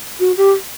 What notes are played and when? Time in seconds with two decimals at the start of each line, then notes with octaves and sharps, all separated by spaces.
0.20 F#4
0.37 G4